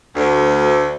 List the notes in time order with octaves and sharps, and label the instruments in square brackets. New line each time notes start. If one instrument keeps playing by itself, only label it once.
[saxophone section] D2